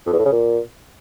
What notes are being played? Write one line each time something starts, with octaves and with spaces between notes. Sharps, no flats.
F2
E2
A2
C#3
A#2